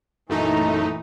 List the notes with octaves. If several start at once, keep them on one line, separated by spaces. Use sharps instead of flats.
A#1 F#2 E3 A3 D#4 A#5